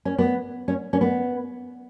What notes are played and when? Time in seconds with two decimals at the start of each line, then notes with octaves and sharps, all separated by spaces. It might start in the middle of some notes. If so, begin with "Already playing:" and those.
0.05 C#4
0.18 B3
0.68 C#4
0.93 C#4
1.01 B3